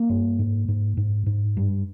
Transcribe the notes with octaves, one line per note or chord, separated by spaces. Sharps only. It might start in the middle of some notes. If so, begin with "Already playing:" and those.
Already playing: A#3
G2
G#2
G#2
G#2
G#2
G2